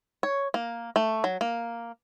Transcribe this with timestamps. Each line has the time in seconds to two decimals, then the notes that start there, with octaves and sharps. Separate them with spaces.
0.23 C#5
0.54 A#3
0.96 A3
1.24 F#3
1.41 A#3